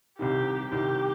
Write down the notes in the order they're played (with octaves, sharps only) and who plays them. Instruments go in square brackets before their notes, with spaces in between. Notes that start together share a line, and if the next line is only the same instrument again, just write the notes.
[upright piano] C2 C3 D#3 [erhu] G4
[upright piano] C2 C3 D#3 [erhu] G4